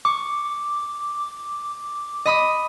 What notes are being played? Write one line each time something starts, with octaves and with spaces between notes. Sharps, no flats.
C#6 D6
D#5 B5 D#6